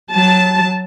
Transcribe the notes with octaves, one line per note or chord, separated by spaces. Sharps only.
F#3 A5